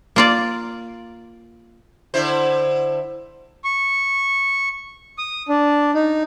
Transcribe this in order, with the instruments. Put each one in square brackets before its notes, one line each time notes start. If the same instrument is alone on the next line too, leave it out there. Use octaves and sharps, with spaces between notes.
[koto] A#3 F4 D5
[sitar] D3 E4 C5
[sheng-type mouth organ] C#6
D#6
D4
D#4